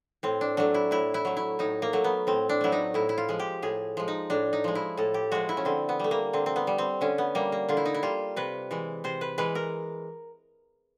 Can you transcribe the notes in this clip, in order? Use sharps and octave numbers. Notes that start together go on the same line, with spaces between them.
A2 C4
D4
F#3 A3 D4
E4
A2 E4
E4
F#3 A3
E4
A2 D#4
A#3
F#3 A3
B3
A2 C4
D4
F#3 A3 E4
D#4
A2 E4
E4
F4
F3 G#3
G4
A2 G#4
F3 G#3
D#4
A2 D4
D#4
F3 G#3
E4
A2 A4
G4
F3 G#3 F#4
E4
C#4
D3 C4
B3
G3 A3
A#3
D3 C4
C4
B3
G3
C4
D3 C#4
B3
G3 A#3
A#3
D3 F4
E4
D#4
E4
G3 F4
C3 B4
E3 G#3
C3 C5
B4
E3 G#3 B4
A#4